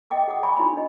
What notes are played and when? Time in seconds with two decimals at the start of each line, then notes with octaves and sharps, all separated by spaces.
0.10 D#5 E5 G5 D6 D#6
0.28 G#4 F#5 D6 D#6
0.43 D5 E5 G#5 B5 C#6 D6
0.56 D#4 E4 D5 G#5 B5 C6
0.73 D4 D#5